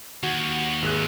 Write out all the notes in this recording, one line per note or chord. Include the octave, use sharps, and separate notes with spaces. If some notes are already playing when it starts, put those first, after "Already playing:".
D#2 F#4
G#1 G#4 F#6